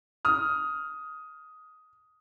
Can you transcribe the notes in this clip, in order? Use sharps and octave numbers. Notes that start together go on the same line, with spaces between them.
D#6 F6